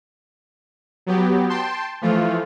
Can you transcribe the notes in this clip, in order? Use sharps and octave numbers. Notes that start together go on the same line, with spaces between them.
F#3 B3 G4
G5 A5 C6
E3 F3 A3 F4